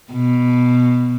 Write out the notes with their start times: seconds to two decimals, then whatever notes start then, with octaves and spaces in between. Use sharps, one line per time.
0.12 B2